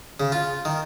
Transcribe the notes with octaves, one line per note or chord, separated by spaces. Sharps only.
C#3
F4
D#3